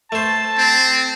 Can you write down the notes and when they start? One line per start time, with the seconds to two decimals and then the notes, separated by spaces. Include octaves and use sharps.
0.12 A3 C5 A5
0.57 C4